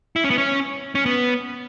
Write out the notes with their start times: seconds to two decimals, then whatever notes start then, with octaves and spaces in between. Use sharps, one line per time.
0.16 E4
0.24 C#4
0.30 B3
0.38 C#4
0.95 C#4
1.06 B3